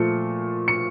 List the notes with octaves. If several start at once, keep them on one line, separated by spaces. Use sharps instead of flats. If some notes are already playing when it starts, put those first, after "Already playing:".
Already playing: A#2 F3 A3 C#7
C#7